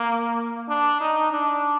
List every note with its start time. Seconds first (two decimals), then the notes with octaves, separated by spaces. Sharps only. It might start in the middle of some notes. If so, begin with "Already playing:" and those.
Already playing: A#3
0.69 D4
1.01 D#4
1.31 D4